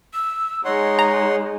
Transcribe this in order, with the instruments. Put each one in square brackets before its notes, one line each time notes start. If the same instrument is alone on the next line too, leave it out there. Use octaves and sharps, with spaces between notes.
[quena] E6
[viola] G#3 D#4 [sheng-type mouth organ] C#5 F#5 C6 [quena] D#5
[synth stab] A#5